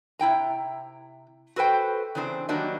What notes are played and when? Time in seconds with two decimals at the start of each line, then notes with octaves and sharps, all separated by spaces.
0.19 C3 E4 G5 A#5
1.56 F#4 A4 B4 C5 G5
2.15 C#3 E3 C4 D4 C5
2.49 D#3 F#3 G3 A#3 D4 D#4